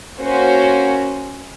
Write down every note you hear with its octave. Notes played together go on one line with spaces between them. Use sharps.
A#3 C#4 F#4 C5